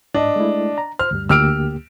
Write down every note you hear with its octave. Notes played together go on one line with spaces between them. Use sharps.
G#2 D4 D#5
G#3 A3 E4
A#5
C5 F6
D2 G2 G3
D2 A#3 G4 E6 F6 D7